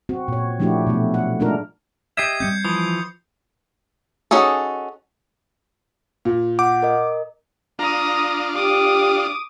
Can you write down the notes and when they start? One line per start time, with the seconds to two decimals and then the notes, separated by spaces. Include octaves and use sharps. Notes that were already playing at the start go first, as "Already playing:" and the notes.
0.09 C4 F#4
0.28 A#2 C#5
0.60 F3 A3 D4 E4 F#4 G4
0.87 B2 F#3 A3
1.14 F#5
1.40 G#3 A3 D4 D#4 F4 A#4
2.17 G4 D#5 E5 G#6 C7
2.40 G3 B3 C4 G6 C#7
2.65 E3 F3 D#6
4.31 C#4 D#4 F#4 G#4 A4
6.25 A#2
6.59 F#5 D6 G6
6.83 A#4 D#5
7.79 D4 F4 A#5 D#6
8.56 G4 D6 D#6